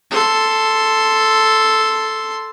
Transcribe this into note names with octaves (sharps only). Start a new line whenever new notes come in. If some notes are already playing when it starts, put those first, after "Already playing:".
A4 C6